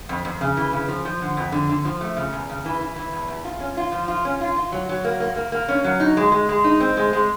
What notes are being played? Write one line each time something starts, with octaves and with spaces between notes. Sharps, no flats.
F2
F2
C#3
E3
C#3
F3
F3
D3
F2
D3
D3
F3
A3
C#3
E2
C#3
E3
E3
E3
E2
E2
F4
C#4
F4
F3
F4
C#4
F4
F4
F#3
F#3
A#3
A#3
A#3
A#3
C#4
F#3
D#4
G#3
G#3
G#3
D#4
C4
G#3
G#3